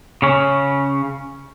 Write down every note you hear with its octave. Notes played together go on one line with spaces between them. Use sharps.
C#3 C#4